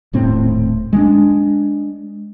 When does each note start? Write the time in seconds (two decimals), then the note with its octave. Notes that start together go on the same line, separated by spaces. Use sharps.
0.13 D#1 A2 C4
0.93 G#3 C#4 D4